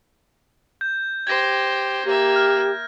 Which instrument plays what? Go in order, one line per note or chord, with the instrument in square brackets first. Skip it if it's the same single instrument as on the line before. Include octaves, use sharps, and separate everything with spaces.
[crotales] G6
[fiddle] G4 C5 [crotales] G#6 A#6
[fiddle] A#3 E5 [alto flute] G4
[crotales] F6